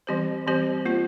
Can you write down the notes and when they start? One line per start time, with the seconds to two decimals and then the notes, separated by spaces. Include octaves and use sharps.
0.07 E3 G3 C4 G4 C5
0.47 E3 G3 C4 G4 C5
0.86 A#3 F4 C5